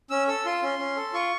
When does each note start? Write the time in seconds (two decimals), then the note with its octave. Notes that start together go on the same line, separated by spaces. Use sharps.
0.10 C#4 E6
0.28 A4 E6
0.45 F4 C6
0.62 C#4
0.79 C#4
0.97 A4
1.14 F4 C#6